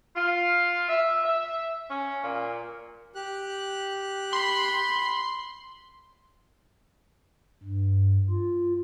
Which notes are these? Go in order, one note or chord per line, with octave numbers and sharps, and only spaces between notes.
F4
E5
E5
C#4
A#2
G4 F#6
B5 C6
G2
F4